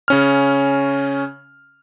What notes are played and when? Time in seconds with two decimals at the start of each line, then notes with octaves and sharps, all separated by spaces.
0.08 C#3 C#4 F6